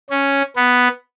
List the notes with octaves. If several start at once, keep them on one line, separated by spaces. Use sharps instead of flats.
C#4
B3